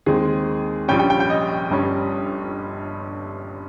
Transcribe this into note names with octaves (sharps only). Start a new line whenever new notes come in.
D#2 D#3 G#3 C4 G#4
A#1 A#2 G3 C#4 G5
G5
G5
G5
D#5
G1 G2 G3 C#4